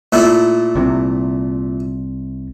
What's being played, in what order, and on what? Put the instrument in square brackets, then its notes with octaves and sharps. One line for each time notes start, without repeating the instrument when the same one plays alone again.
[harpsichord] A#2 A3 E4
[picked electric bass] C2 C3